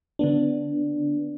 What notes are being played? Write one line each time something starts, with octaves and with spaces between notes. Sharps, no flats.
D3 B3 D4